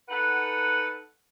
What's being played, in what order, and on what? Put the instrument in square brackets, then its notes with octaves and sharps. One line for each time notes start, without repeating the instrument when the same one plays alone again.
[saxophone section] D#4 A4 B4 F#5